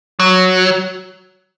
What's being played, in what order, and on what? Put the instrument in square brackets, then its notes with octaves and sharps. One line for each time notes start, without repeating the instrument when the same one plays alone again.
[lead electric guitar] F#3